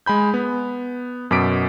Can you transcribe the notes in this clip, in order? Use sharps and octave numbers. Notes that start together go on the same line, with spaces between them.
G#3 G#5 B5 G6
B3
F#2 B2 D6 B6 D7